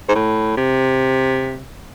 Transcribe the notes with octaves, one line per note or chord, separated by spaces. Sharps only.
G#2
A2
C3